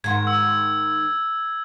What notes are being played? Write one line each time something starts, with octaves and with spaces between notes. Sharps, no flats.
G#2 D#3 G#6
E6